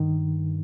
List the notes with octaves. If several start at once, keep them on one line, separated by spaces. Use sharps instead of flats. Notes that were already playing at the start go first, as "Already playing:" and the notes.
Already playing: G2 D#3